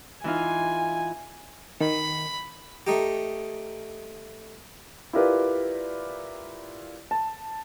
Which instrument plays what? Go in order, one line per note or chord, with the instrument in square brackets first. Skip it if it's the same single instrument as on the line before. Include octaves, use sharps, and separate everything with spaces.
[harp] E3 D#4 F4 [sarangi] G#5
[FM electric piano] D#3 [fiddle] B5
[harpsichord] A3 D#4 G4
[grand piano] E4 F4 G4 A#4 B4 D5
A5